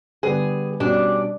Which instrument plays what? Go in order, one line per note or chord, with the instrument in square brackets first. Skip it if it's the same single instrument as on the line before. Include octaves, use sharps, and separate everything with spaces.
[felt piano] D3 G3 B3 [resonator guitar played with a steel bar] G#4
[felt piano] B2 G3 C#4 [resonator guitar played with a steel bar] D4